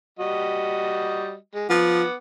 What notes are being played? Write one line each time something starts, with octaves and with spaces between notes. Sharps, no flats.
G3 F#4 D#5
G#3
F3 B3 F#5 D6